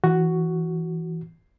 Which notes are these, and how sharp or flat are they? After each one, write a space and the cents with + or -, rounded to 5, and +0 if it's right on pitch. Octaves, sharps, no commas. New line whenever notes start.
E3 +0 F#4 +5